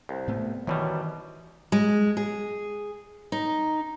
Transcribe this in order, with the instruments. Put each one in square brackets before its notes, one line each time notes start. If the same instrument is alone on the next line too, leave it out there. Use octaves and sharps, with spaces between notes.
[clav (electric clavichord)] C2 [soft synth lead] C5
[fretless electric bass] A2 A3 B3
[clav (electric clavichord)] F#2 B2 G3 [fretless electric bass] D#3 E3 [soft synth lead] C#5
[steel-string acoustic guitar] G#3
G#4
D#4